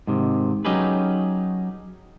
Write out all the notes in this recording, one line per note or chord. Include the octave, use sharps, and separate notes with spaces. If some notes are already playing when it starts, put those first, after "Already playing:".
G#2 C3 D#3
F#3 C#4 D#4 G4 G#4 B4